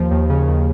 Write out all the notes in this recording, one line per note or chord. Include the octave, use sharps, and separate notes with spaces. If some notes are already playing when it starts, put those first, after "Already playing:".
Already playing: D#2 F3
D#2
C#3
D#2